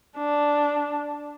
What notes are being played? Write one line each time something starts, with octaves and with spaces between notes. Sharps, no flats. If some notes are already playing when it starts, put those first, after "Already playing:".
D4